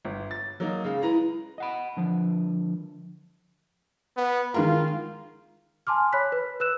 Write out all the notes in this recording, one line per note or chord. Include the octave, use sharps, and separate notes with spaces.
G1
A6
F#3 A#3 D#4
C#3 G#3 F5
G#3 E4 B4 A#5
D#5 F#5 B5
D3 F3
B3
D#3 G#3 F4 A#4
G#5 A5 C6 D6 F6
C#5 B5 F#6 B6
B4
B4 E6 F#6 E7